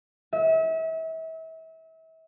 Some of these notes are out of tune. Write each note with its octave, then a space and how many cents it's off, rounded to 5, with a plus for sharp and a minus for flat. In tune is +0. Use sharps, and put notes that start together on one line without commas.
E5 -35